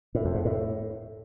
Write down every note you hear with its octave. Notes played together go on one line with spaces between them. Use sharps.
A2
F2
G#2
A2